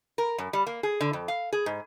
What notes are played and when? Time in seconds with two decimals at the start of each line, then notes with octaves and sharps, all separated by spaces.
0.18 A#4
0.38 F#2
0.53 G3
0.67 A#3
0.83 G#4
1.01 D3
1.13 F2
1.28 F5
1.53 G#4
1.66 G#2